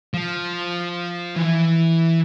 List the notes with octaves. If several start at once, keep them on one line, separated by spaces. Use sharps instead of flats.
F3
E3